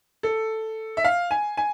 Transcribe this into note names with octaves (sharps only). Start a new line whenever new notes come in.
A4
E5
F5
G#5
G#5